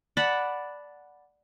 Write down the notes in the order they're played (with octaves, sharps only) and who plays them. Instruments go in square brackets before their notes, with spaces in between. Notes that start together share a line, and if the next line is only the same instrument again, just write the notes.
[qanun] D5 F#5 A5 B5